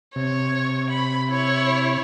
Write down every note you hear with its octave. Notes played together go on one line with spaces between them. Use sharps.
C3 C#5
B5
E4 C#5